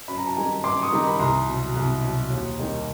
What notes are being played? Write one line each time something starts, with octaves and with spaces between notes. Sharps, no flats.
F#2 B5
A#5
A5
D#3 G3 G#5 A#5
F#2 C6 D6
C#6 D#6
D#3 G3 A#5
B5
C2 A#5 C6
B2 F#3
C2
B2 F#3
D#2
D#3 G3